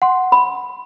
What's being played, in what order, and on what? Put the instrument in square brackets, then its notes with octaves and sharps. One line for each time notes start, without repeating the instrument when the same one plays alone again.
[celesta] F#5 C6
[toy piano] B5